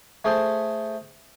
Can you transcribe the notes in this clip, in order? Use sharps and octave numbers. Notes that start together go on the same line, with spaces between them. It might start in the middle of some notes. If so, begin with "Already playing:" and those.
A3 G#4 A4 C5